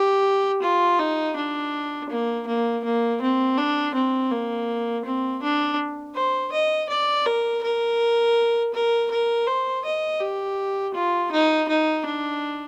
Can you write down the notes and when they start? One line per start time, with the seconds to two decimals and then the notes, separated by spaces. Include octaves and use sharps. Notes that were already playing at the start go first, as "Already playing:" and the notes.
Already playing: G4
0.62 F4
0.99 D#4
1.36 D4
2.10 A#3
2.47 A#3
2.84 A#3
3.21 C4
3.58 D4
3.95 C4
4.31 A#3
5.05 C4
5.42 D4
6.15 C5
6.52 D#5
6.89 D5
7.26 A#4
7.63 A#4
8.74 A#4
9.11 A#4
9.47 C5
9.85 D#5
10.20 G4
10.94 F4
11.32 D#4
11.68 D#4
12.05 D4